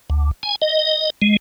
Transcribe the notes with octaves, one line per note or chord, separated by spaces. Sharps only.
D2
G#5
D#5
G#3